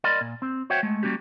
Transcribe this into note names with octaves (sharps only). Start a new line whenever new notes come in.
A#4 D5 D#5 B5 C6
A#2
C4
F#4 C5 C#5 E5 F#5 G5
G#3 A3
G3 A#3 C#4 F#4 G4